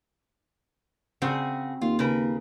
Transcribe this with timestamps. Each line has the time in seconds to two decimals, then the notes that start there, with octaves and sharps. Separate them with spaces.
1.22 C#3 C4 F#4 G#4
1.81 D#2 F4
1.99 C#3 A#4 B4